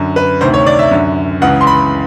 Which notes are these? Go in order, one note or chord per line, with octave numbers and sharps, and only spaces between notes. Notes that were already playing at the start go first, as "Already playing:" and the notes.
Already playing: F#2 D3
B4
D2 C3 D#3 C5
C#5
D5
E5
F#2 D3
C#2 C#3 E3 F#5
C6
B5